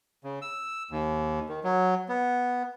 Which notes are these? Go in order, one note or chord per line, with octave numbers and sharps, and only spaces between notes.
C#3
E6
D#2
D#3
F#3
B3